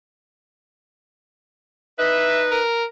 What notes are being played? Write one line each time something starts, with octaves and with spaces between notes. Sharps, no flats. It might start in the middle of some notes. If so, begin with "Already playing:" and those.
D#4 B4 E5
A#4